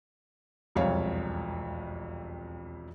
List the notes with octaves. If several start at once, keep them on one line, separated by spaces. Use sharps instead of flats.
E1 C2 F2 C#5 F5